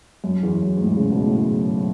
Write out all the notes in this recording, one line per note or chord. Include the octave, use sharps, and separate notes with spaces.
F#2
E2
F#2
G#2
A2
C#3
B2
A2